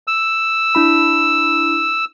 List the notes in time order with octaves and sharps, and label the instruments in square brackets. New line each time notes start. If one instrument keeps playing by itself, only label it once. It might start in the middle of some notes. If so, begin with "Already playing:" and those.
[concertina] E6
[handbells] D4 E4 B5